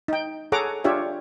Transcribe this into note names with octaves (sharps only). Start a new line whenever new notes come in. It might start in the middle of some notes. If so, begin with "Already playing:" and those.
D#4 G5
G#4 A4 C#5 F#5 A#5 D6
D4 F4 G4 C#5 E5